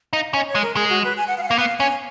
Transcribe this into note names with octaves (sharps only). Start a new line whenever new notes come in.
D#4 F5
C#4 D#5
C#5
G#3
A#4
G#3 G#4
F#4
B4
G#5
F#5
F5
F#5
F5
A#3
B3 F5
C#4 G#5